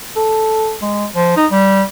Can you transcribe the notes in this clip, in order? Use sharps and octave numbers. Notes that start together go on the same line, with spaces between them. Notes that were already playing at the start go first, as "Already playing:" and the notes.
A4
G#3
F3
D#4
G3